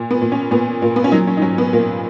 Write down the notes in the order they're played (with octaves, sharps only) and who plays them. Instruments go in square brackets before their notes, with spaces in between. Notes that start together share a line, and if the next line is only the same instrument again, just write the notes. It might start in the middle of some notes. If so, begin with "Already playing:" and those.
Already playing: [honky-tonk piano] A#2
B3
A#2
C#4
A#2 B3
A#2 A#3
B3
C#4
F#3 D#4
C#4
D#4
F#3 C#4
B3
A#2 A#3